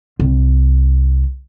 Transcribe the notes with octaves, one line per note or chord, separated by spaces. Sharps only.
C2